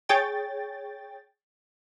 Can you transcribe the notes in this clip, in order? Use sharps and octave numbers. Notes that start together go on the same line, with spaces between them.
G#4 C#5 G5 A6